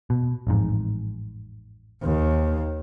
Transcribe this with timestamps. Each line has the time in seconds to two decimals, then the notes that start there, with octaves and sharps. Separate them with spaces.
0.10 B2
0.47 A1 F2 G#2
2.03 D#2